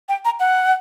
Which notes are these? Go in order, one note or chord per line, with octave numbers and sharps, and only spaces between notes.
G5
A#5
F#5